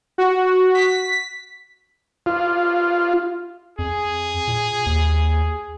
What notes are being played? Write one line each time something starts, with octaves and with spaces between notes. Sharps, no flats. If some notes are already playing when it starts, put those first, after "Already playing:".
F#4
B6
F4
F2 G#4
A#2
D#2